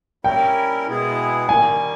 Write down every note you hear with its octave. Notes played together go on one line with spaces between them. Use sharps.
G3 C#4 E4 A#4 G5
B2 G#3 B3 E4 G#4
D#3 G3 A#3 G#5